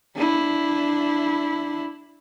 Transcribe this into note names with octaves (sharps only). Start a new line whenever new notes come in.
D4 E4